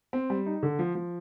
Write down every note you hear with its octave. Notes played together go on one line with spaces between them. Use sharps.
C4
G3
D#4
D3
F3
F3